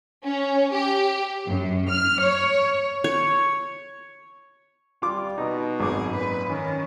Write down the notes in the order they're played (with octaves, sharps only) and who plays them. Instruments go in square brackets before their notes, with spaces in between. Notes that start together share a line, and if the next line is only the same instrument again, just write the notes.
[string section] C#4
G4
F#2
F6
C#5
[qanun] C#5
[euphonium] G3 [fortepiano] F4 D6
[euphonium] B2 [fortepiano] D#4
[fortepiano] G#1 D6 [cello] F#2 G#4
[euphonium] A#2 [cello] B4
[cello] D#3 [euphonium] C#4